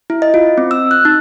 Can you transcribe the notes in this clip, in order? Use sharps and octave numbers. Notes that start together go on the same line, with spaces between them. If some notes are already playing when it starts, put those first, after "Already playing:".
E4
D#5
F4
C4
E6
F#6
D#4